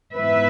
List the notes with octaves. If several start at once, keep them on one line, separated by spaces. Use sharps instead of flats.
G#2 E3 B3 E4 B4 E5